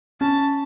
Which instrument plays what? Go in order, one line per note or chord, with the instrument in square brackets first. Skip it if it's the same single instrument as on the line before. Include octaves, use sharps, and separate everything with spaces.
[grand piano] C#4 [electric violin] A5